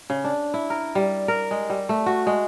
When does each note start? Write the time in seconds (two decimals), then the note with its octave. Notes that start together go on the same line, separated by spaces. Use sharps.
0.10 C#3
0.24 D4
0.54 E4
0.70 A#4
0.95 G3
1.28 A#4
1.51 G#3
1.70 G3
1.89 A3
2.06 F#4
2.27 G#3